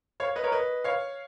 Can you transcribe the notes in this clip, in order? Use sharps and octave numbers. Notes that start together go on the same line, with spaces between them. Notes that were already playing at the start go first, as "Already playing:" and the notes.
C#5 F5
B4 D#5
A#4 C#5
B4 D#5
C#5 F5